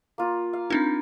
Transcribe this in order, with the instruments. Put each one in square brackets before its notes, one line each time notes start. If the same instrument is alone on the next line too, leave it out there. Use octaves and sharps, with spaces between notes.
[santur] A#3 F4
F5
[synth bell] C4 D4 D#4 [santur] A#4 B5 C6